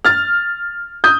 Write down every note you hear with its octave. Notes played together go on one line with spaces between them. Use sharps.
F6 A6
D#6 G6